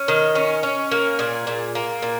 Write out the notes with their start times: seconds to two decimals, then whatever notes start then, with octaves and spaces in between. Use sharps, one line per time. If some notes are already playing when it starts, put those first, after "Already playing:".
Already playing: C#4
0.08 D#3 D#5
0.35 C#4
0.63 C#4
0.91 A#3
1.19 A#2 G#4
1.47 A#2
1.75 A#3
2.02 A#2